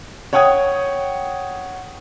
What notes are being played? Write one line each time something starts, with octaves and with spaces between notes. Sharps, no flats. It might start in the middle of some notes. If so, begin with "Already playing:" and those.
C#5 F#5 G5 D#6 G#6